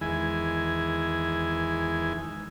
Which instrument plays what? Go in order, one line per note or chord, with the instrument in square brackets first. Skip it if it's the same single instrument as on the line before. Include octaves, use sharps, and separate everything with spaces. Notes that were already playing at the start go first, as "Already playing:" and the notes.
[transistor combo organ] E2 D#3 G#3 E4 G#5